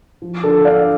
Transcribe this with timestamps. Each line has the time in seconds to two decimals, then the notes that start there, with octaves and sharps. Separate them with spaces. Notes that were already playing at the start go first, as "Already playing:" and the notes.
0.22 F3
0.44 D3 A4
0.65 D4 D5 F5